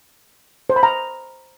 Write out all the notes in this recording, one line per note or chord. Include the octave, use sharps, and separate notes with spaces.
C5
B5
A#5